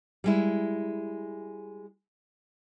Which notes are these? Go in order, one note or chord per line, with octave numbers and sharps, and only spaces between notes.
G3 G#3 E4